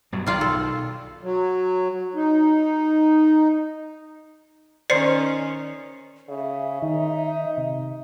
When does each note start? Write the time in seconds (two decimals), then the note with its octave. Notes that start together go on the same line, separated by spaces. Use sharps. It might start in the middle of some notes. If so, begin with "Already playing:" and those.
0.12 G2 B2 F#3
0.26 B1 D#3 G3 F4 D5
0.41 A4
1.23 F#3
2.15 D#4
4.90 D#3 C#4 C5 D5 C6 C7 C#7
6.29 C#3 E5
6.82 D#3 D#4
7.58 C3